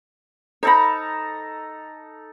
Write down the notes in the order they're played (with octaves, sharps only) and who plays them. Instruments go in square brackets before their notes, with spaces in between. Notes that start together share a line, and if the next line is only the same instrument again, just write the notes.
[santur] D#4 A4 A#5 [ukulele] C5 B5